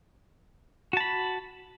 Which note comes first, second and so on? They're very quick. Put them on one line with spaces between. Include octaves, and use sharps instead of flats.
F#4 A5 B5